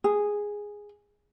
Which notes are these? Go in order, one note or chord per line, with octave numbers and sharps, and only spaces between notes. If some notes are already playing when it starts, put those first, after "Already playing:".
G#4